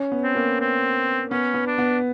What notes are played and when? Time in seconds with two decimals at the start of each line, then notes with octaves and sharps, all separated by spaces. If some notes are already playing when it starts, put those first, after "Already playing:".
Already playing: C#4
0.12 B3
0.23 C4
0.35 A#3
0.60 C4
1.30 B3 C#4
1.54 B3
1.66 D4
1.78 B3